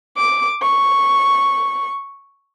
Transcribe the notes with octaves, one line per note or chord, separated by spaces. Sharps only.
D6
C#6